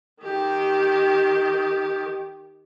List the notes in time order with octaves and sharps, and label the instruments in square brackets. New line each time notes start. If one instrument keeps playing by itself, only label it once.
[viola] D#3 G4